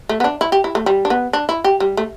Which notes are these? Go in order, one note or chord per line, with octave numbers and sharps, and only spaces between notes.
A3
B3
D4
E4
G4
E4
A3
G3
D4
B3
D4
E4
G4
G3
A3